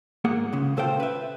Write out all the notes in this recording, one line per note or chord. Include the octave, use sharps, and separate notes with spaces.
G#2 A#3 G#4 F#5
C#2 C#3
C#2 A#2 A4 C5 F5 G5
B4 E5